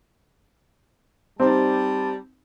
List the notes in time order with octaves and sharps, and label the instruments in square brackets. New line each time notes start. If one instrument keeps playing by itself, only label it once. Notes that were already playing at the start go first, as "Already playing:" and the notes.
[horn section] G3 A5 [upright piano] C4 D#4